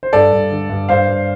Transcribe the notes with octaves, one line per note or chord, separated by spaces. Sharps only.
C5
G2 A4 D5
G2
D3
G2
G2 C5 F5
G2